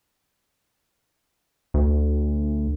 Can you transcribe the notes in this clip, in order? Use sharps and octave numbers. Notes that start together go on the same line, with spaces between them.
D2